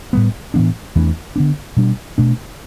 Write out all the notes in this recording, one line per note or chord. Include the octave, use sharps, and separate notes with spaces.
A2 G3 B3
A2 E3 B3 D4
E2 E3 A3 D4
D3 B3 D4
B2 G3 D4
B2 A3 D4